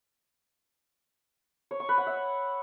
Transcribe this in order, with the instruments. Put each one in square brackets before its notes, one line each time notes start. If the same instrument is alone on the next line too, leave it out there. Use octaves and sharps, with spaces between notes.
[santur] C#5
C#6
B4
F#5
E5